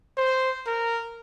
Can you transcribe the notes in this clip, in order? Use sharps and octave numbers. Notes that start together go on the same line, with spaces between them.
C5
A#4